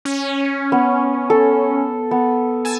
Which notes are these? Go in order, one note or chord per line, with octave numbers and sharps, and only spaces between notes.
C#4
B3
A4
B3
G#5 A5 E6